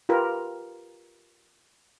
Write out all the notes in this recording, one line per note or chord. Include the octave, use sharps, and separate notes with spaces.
F4 G4 A#4 B4